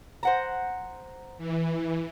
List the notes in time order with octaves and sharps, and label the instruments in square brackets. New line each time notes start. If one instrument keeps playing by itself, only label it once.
[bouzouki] C5 F#5 A#5
[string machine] E3